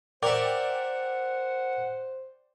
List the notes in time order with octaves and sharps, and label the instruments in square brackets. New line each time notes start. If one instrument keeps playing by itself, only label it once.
[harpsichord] A#4 E5 [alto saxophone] C5 [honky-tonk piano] D5 G5 [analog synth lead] F#5